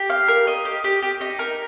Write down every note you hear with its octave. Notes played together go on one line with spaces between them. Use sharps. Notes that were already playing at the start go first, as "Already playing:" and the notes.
Already playing: G4
F5
A#4
D#5
G4
G4
G4
D#4
A#4